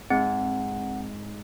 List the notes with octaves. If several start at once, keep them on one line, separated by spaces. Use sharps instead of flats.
G#2 C4 F#5